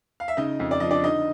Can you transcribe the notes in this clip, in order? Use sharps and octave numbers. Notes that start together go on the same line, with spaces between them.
F5
E5
C#3 D#4 D#5
F2
D5
F3 D#5
D4 D5
D3 D#4 D#5